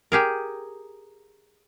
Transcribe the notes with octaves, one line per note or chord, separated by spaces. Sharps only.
G4 G#4 A#4